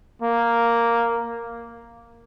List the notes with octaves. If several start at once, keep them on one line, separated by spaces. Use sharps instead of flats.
A#3